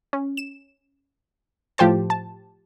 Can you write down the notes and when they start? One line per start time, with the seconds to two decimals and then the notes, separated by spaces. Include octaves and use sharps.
0.13 C#4
0.37 E7
1.78 A2 F3 G4 C5 A5
2.10 A5